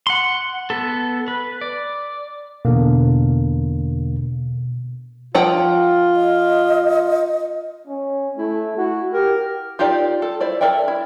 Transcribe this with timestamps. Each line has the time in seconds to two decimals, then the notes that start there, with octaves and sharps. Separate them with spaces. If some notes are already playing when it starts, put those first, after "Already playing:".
0.07 F#5 C6
0.70 B3 A4
1.28 B4
1.61 D5
2.65 E2 B2 D3 A#3
5.35 F3 F4 F#5 G5
6.16 D#5
7.88 C#4
8.38 A3 E4
8.78 E4 F#4
9.13 G4 A#4
9.79 D#4 F4 G4 A#4 D5
10.22 A4
10.41 E4 C5 D5
10.61 A4 A#4 D5 E5 G5
10.88 E4